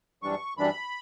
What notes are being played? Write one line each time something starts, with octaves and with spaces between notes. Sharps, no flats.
F#2 E3 G3 D4 C#6
F#2 E3 G3 D4 B5